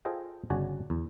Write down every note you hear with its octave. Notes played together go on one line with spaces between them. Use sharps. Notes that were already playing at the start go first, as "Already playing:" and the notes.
F4 G#4 A4 C5 D#5 G5
G1 C#3 F#4 D5 G#5 A5
E2